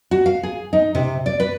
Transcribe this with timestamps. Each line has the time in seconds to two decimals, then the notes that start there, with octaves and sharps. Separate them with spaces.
0.11 F#4
0.26 F5
0.43 G#4
0.73 D#4
0.95 C3
1.26 D5
1.40 B4